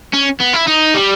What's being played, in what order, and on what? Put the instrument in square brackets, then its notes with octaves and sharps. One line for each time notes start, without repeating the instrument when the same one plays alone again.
[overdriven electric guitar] C#4
B3
E4
D#4
G3